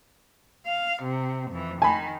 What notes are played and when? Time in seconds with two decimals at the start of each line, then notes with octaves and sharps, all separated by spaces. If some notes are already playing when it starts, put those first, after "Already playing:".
0.66 F5
1.03 C3
1.51 F2 E3
1.82 D#3 G#5 B5